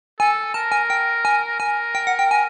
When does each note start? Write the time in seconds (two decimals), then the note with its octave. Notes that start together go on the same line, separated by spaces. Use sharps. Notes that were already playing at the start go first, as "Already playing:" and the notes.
0.20 A4 G#5
0.54 A#4 A5
0.72 G#5
0.90 G5
1.25 G#5
1.60 A#4 G#5
1.95 G5
2.07 F#5
2.19 G5
2.31 G#5